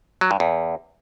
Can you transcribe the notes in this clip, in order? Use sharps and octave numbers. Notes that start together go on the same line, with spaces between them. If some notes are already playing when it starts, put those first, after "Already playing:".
F#3
G2
E2